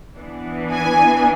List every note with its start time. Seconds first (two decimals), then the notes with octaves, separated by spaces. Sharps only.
0.18 E3 B3 D4
0.72 G#5